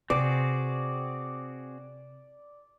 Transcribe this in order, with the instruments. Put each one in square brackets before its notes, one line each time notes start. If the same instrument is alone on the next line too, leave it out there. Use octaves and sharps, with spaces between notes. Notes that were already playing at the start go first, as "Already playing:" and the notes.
[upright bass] C3 [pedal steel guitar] C4 F#4 G#4 [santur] D5